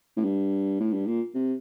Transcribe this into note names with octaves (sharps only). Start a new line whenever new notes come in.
A2
G2
A2
G2
A#2
C3